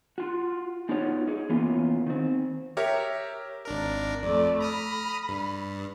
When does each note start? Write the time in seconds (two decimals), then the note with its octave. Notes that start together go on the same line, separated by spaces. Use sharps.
0.18 F4 F#4
0.89 B3 D#4 F4 F#4 B4 C#5
1.27 D#4 G#4
1.49 E3 A#3 B3 C#4 F4
2.07 D#3 C4
2.77 G4 A#4 C#5 E5
3.65 G#1 D4 A#4
4.22 F2 A3 D5
4.60 A#5 B5 D#6 F6
5.29 G2